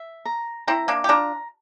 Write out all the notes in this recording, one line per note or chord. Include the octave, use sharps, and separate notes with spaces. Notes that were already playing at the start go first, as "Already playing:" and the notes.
Already playing: E5
A#5
C4 E4 A#5
A#3 D4
G4
D4 F4 A#5